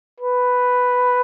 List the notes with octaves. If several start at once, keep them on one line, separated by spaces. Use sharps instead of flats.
B4